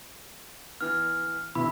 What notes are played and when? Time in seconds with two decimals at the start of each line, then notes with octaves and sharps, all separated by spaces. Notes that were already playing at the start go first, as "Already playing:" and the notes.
0.81 E3 B3 F6
1.55 D2 B2 E4 B5